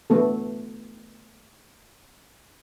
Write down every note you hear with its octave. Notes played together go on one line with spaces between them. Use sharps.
A3 B3 A4